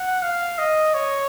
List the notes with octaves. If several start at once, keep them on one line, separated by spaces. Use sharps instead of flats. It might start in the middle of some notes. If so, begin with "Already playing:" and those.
Already playing: F#5
F5
D#5
C#5